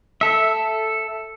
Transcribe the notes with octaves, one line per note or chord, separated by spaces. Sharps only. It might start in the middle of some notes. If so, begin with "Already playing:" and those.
A4 E5